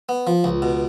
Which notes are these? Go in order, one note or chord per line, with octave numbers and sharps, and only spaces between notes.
B3
F3
C#2
B2